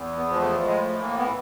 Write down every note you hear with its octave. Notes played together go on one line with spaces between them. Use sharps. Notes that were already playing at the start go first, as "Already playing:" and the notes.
Already playing: E2
B3
F3
G#3
A3
A2 G#3
A3
E3 A#3
B3